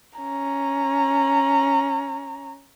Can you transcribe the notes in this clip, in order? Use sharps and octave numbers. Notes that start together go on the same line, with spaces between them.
C#4 A#5